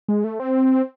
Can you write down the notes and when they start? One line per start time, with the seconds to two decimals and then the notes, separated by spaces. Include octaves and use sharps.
0.08 G#3
0.24 A3
0.40 C4